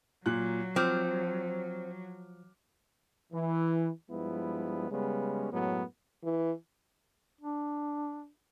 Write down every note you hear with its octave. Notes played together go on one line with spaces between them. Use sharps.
A#2 F#3 F#6
F3 C4 D6 F6
E3
G2 F3 G#3 B3 E4
C#3 G3 G#3 B3 C#4
F#2 A2 F#3 G#3 B3
E3
D4